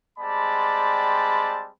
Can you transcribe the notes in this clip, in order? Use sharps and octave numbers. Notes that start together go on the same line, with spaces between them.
G3 G#3 C4 D5 A5 B5